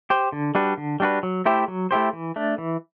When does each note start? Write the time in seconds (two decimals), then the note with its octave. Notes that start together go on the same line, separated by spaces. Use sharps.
0.10 G4 C5
0.32 D3
0.55 G3 D4 F#4 B4
0.78 D3
1.00 G3 D4 F#4 B4
1.23 F#3
1.46 A3 E4 G4 C5
1.68 F#3
1.91 A3 E4 G4 C5
2.13 E3
2.36 A3 D4
2.58 E3